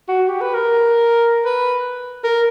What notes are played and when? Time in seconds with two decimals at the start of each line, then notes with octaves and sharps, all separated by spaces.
0.08 F#4
0.28 G4
0.41 B4
0.54 A#4
1.45 B4
2.24 A#4